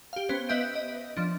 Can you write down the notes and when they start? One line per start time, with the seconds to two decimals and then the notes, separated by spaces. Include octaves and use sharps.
0.13 G4 F5
0.29 B3 C#4 C5
0.49 B3 B4 D#5 E5 G6 D7
0.75 D#5
1.17 F3 D4